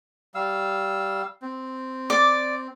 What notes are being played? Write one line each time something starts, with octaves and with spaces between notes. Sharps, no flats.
G3 F5 E6
C4
D5 D6